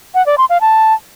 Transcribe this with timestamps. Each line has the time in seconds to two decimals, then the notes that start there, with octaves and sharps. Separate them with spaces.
0.15 F#5
0.26 D5
0.38 C6
0.50 F5
0.61 A5